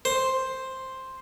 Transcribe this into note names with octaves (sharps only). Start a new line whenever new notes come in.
C5